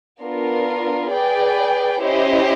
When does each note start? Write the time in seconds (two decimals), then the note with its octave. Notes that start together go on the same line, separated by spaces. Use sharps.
0.21 B3 D4 F4 A#4
1.11 G#4 B4 D5 G5
2.00 C#4 E4 G4 C5 D#5